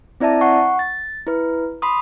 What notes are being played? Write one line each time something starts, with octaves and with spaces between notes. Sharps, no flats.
C4 E4 D5 E5 A5
F#5 C#6
A6
E4 B4
B5 C6 D#6